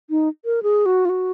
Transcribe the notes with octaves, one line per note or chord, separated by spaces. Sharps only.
D#4
A#4
G#4
F#4
F4
F#4